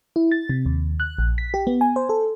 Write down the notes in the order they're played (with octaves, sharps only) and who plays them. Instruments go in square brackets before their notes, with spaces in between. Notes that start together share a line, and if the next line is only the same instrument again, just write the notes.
[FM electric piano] E4
A6
C3
D#2
F#6
A#1
B6
G4
B3
G#5
C5
A4